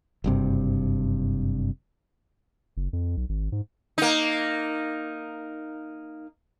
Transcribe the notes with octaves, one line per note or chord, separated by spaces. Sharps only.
F#1 G2 C3
F#1
F2
B1
G#1
G#2
A#3 D#4